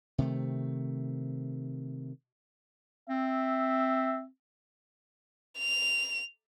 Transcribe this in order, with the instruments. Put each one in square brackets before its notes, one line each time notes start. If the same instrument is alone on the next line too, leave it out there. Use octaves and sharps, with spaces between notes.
[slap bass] C3 D#3 A3
[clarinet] C4 [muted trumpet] E5
[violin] F7